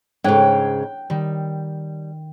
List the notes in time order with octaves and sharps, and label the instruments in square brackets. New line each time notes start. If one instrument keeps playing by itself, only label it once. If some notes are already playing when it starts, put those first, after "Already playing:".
[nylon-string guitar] G#2 C#3 [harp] C#5 F#6 G#6 [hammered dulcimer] G5
[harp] D#3 [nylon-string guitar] G3